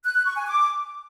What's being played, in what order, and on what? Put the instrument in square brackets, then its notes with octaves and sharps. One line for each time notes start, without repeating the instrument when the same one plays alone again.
[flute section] F#6
F#6
C#6
G#5
D6